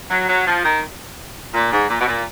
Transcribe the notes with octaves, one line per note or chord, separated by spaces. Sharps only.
F#3
F#3
F3
D#3
A#2
G#2
A#2
B2
A#2